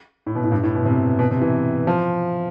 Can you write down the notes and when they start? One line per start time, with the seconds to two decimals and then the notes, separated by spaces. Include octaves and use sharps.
0.26 A2
0.35 B2
0.44 A2
0.52 G2
0.63 A2
0.75 B2
0.85 C3
1.19 B2
1.31 C3
1.41 E3
1.87 F3